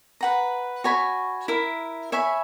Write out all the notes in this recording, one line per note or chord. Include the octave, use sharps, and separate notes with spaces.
B4 F#5 A#5
F#4 C#5 G#5 B5
E4 A#4 E5
C#5 E5 G#5 B5